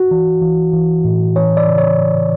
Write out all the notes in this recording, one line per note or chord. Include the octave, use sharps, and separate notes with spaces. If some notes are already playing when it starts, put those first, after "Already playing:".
Already playing: F#4
E3
E3
E3
A2
E3 C#5
D5
C#3
C#5